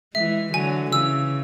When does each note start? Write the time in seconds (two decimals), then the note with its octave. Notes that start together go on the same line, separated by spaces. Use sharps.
0.14 E3 G#3 E5
0.53 D3 F#3 G#5
0.91 C#3 E3 E6